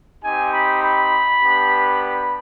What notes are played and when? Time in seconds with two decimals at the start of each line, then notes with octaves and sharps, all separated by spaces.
0.23 C4 D#4 G4 G#5
0.53 B5
0.83 B5
1.42 B3 D4 G4
2.02 B5